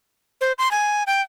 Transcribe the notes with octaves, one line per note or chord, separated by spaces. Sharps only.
C5
C6
G#5
G5